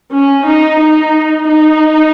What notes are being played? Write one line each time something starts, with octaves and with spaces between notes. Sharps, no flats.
C#4
D#4
D#4
D#4